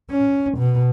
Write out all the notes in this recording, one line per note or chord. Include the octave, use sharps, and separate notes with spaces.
C#4
B2